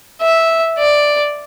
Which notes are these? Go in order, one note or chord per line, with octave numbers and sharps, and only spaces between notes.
E5
D5